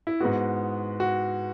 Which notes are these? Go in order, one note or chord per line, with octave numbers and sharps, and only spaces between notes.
E4
G#2 G#3 B3 F#4
F#4